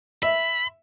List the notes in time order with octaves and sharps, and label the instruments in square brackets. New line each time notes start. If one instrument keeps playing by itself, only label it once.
[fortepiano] E5 [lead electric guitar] B5